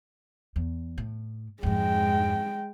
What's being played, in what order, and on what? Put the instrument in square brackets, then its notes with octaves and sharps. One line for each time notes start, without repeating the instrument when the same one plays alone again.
[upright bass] E2
A2
[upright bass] F2 G#2 [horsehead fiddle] G#3 G5